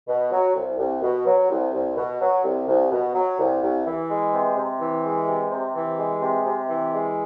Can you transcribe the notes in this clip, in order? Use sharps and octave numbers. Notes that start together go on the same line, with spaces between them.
B2
F#3
C2
C2
B2
F#3
C2
C2
B2
F#3
C2
C2
B2
F#3
C2
C2
E3
G#3
C3
C3
E3
G#3
C3
C3
E3
G#3
C3
C3
E3
G#3